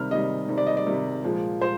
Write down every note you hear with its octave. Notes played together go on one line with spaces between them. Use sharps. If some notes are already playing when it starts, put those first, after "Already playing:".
Already playing: C3 D#3 G3 F6
C3 D#3 G3 D#5
C3 D#3 G3
D5
D#5
D5
C3 D#3 G3
A#2 F3 G#3
A#2 C5